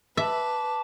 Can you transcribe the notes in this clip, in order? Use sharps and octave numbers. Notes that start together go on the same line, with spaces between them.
B4 E5 A5 D6